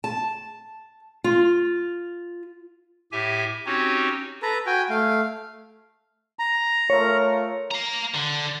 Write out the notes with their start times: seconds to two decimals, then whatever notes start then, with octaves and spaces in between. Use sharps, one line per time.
0.04 A5
1.24 F4
3.12 A2 G4 E5 G#5
3.66 C4 C#4 D#4 F#4 G4 C#5
4.42 A4 B4 A#5
4.66 F#4 G5 G#5
4.90 A3 F5
6.39 A#5
6.90 A3 F4 A#4 C#5
7.72 F5 A#5
8.15 D3